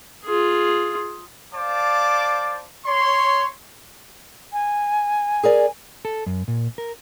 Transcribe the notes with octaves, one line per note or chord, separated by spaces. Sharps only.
F4 G#4
C5 D5 F5 A5 D6
C#5 C6
G#5
G#4 A#4 D5
A4
F#2
A#2
A#4